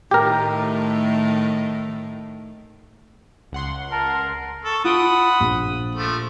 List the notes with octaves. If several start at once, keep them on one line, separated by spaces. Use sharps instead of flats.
A2 D#3 A3 G4 A#4
C#2 F#5 C6
A#4 A5
A4 C#6
F4 F#5 B5 D#6 D7 G7
A#1
F3 A3